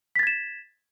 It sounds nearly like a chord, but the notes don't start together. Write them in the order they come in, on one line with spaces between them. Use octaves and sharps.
B6 A6 G#6 E7